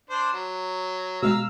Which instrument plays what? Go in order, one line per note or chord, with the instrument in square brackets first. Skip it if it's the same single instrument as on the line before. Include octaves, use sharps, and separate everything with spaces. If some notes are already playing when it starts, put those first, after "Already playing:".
[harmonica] D4 C5
F#3
[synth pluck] B2 G#3 [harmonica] F5 A#5 E6